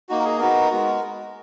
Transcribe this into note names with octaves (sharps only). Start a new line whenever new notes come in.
A#3 D#4 F#4
A#4
G#4
B3 D#4 F#4 A#4
G#3 B3 F#4